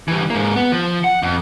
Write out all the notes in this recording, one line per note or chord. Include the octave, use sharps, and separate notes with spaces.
E3 G3
G#2 A#3
B3
F3
F#5
F2